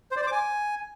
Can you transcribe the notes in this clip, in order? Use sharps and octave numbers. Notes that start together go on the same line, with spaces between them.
C5
D5
C5
D6
G#5